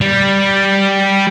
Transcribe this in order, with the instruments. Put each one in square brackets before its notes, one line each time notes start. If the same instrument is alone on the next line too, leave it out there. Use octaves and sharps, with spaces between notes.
[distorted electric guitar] G3